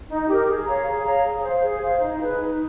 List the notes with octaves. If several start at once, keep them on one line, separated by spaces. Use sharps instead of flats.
D#4
G4 A#4
G#4
C#5 F5 A#5
G#4
C#5 F5 A#5
G#4
C5 F5
G#4
C5 F5
D#4
G#4 B4
D#4